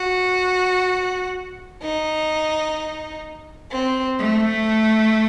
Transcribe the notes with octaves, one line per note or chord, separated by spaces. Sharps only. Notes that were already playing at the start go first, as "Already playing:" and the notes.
Already playing: F#4
D#4
C4
A3